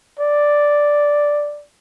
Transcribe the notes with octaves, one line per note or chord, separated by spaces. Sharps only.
D5